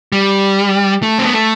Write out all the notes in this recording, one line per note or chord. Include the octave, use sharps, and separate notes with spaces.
G3
A3
C4
B3
A3